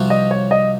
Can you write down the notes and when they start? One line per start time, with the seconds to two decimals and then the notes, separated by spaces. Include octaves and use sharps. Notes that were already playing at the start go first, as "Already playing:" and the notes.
Already playing: C2 C3 F3 C4 F#4
0.10 D#5
0.31 C#5
0.51 D#5